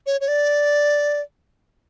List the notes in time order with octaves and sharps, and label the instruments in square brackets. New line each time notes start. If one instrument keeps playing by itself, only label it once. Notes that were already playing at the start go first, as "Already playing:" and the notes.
[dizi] C#5
C#5
D5